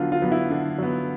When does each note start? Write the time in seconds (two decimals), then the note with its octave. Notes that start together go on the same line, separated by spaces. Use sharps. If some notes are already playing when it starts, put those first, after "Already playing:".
Already playing: D3 F#3 B3 F4
0.12 F4
0.22 F#3 B3
0.32 E4
0.50 D3
0.78 F#3 B3